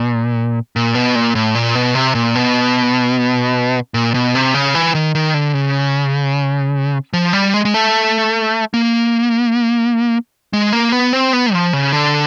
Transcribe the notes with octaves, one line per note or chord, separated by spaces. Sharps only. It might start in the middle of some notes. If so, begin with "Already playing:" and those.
Already playing: A#2
A#2
B2
A#2
A2
A#2
B2
C3
A#2
B2
A#2
B2
C3
C#3
E3
D#3
D#3
D3
C#3
F3
G3
G#3
G#3
A3
A#3
G#3
A#3
B3
C4
B3
F3
C#3
D3